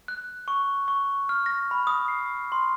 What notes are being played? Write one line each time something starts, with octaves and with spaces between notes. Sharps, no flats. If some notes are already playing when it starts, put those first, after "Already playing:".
F#6
C#6
C#6
F6
A#6
B5
D#6
C7
C6